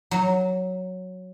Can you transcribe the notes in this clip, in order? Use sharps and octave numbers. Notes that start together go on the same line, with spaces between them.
F#3